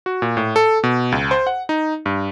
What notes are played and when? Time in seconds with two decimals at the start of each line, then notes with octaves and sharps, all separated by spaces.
0.06 F#4
0.22 A#2
0.37 A2
0.56 A4
0.83 B2
1.12 C#2
1.31 C5
1.47 F#5
1.69 D#4
2.06 G2